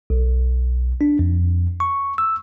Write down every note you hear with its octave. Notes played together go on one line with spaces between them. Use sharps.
B1
D4
F2
C#6
E6